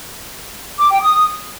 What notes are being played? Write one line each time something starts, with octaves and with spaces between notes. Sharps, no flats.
D6
G5
D#6